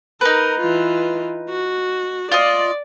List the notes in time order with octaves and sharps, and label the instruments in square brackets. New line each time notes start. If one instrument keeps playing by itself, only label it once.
[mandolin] D#4 B4 [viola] A#4
[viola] E3 F4
F#4
[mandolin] F4 D#5 [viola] D5